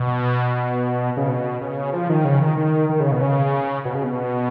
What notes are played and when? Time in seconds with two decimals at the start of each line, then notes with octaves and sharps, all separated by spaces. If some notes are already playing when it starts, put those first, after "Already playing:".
Already playing: B2
1.17 C#3
1.29 B2
1.61 C#3
1.93 F3
2.10 D#3
2.24 C#3
2.42 D#3
2.58 D#3
2.89 D#3
3.00 C#3
3.11 B2
3.21 C#3
3.85 B2
3.95 C#3
4.04 B2